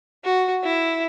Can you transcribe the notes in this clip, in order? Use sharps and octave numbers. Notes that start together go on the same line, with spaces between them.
F#4
E4